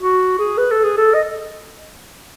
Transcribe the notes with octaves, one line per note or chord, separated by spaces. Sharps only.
F#4
G#4
B4
A4
G#4
A4
D#5